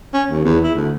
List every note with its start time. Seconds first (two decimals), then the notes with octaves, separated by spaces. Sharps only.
0.14 C#4
0.30 D#2
0.45 E2
0.64 E4
0.75 D2